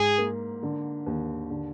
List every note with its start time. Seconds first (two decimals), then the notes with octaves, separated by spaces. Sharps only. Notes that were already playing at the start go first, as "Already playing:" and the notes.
Already playing: G#2 G#4
0.18 A#3
0.63 D3
1.07 D#2
1.50 D3